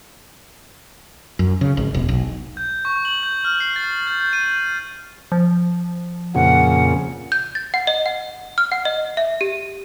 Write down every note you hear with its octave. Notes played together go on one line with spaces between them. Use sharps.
F#2
C#3
G#1
E1
B1
G6
C#6
F#7
G6
F6
C7
A6
G6
G6
D#7
F3
F2 A#2 C#3 F#5
G6
A6
F#5
D#5
F#5
F6
F#5
D#5
E5
G4